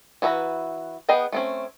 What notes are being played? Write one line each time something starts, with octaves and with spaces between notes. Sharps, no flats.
E3 F#4 B4 E5 A#5
B3 G#4 B4 D#5 G5
A3 C4 C#4